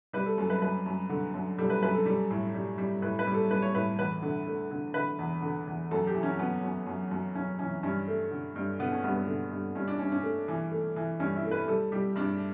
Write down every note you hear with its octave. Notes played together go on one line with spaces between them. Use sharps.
G3 B4
A4
F#2 A4
B4
F#2 B4
F#2
D3
F#2
G3 A4
B4
F#2 B4
A4
G3 A4
A2
G3
G3
A2 B4
B4
G3
A4
G3 B4
C#5
A2 B4
E2 B4
D3
A3
D3
D3 B4
E2
D3
E2
F#2 A4
G4
E3
C#4
F#2 B3
F#2
F#2
F#2
F#2 C#4
E3 C#4
G2 C#4
A3
D3
G2
D3 B3
C#4
G2 B3
B3
D3
G2
G2 C#4
D4
G2 C#4
C#4
A3
E3
A3
E3
G2 C#4
E4
A3
B4
G3 A4
G3 G4
G2 D4